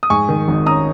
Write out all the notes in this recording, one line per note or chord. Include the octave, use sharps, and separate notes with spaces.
D#6
G#2 G#5 C#6
D#3
G#1
C#4 A#5 D#6